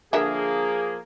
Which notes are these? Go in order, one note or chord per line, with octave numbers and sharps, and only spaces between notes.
D3 F3 A#3 G#4 A#4 E5